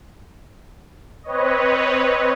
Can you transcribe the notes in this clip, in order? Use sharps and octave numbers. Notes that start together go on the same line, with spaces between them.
C4 B4 C#5 D#5